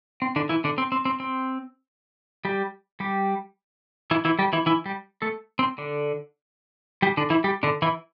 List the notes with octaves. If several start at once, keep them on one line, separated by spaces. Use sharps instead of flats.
C4
D3 D4
E3 E4
D3 D4
C4
C4
C4
C4
G3 G4
G3 G4
E3 E4
E3 E4
G3 G4
E3 E4
E3 E4
G3 G4
A3 A4
C4
D3 D4
G3 G4
D3 D4
E3 E4
G3 G4
D3 D4
E3 E4